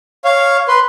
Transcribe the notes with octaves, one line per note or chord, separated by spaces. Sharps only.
C#5 F5
B4 C6